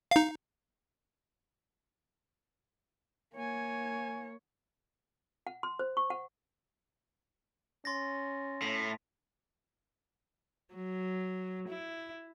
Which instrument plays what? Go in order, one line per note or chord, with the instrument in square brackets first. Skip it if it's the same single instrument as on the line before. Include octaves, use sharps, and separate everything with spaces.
[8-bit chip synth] D#4 F5
[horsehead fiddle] A#3 C#5 [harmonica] G#5
[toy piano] F#5
C6
C5
C#6
F#5
[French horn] C#4 [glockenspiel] C6 A6 A#6
[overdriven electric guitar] A2 [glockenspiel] B6
[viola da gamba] F#3
E4